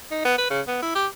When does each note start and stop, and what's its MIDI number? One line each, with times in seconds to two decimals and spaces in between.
0.11 0.20 63
0.25 0.34 59
0.38 0.46 71
0.50 0.61 49
0.68 0.78 59
0.82 0.93 64
0.95 1.07 67